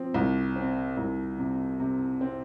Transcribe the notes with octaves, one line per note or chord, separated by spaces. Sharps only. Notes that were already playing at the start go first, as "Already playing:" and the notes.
Already playing: F3 C4
C2
C4
C2
C3
C3
C4